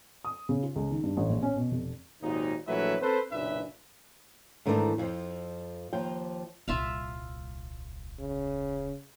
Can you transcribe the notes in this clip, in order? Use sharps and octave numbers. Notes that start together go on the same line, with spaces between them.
D#6
C#3
F4
C#2
D#3
G2
A1
A#1
C#4
B2
F1
G#1 D#2 A#2 D#4
A#1 E3 F#3 A3 B4 E5
C4 A4 B4 C5
F#1 B1 A#2 D4 B4 E5
G#2 D#3 E3 A3 C#4 D4
F2 F3
D#2 F3 G5
D#1 C2 F4 E5 F5
C#3